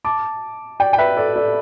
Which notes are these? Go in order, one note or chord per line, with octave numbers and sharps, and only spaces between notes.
A5 D6
D5 G5
G5
B4 E5
A4 D5
A4 D5